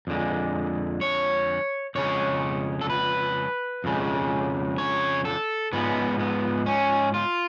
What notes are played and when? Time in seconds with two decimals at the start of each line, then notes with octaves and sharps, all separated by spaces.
0.07 F2 D3 G#3
1.01 C#5
1.95 F2 C#3 G#3 C#5
2.81 A4
2.90 B4
3.84 F2 C#3 G#3
4.78 C#5
5.25 A4
5.73 G#2 F3 G#3 B3
6.19 B3
6.66 C#4
7.14 F4